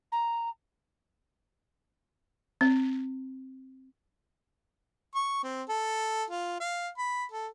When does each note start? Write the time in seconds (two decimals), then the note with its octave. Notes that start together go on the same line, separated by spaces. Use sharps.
0.12 A#5
2.61 C4
5.15 C#6
5.43 C4
5.69 A4
6.30 F4
6.60 F5
6.98 B5
7.32 A4